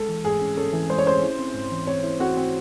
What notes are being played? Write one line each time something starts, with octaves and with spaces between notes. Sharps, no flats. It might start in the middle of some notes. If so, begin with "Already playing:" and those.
Already playing: G#3 A4
E3
G#2 G#4
C#4
C#4 A4
E3
G#3 C5
C#5
C#4 C5
E4
C4
G#2
E3
C4 C#5
E4
C4 F#4
C4